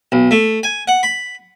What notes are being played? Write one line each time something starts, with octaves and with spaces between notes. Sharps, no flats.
B1
A3
G#5
F#5
B5